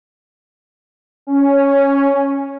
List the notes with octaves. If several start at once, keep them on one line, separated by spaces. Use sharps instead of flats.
C#4